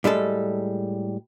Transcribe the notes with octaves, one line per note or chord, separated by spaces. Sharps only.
A2 G3 G#3 A4